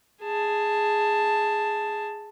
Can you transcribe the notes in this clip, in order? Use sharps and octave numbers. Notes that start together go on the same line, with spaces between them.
G#4 A5